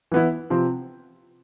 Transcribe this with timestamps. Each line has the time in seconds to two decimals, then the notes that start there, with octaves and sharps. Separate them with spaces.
0.12 E3 B3 E4
0.50 C3 F3 C4